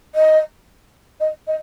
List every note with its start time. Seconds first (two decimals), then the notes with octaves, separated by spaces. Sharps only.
0.15 D#5
1.20 D#5
1.47 D#5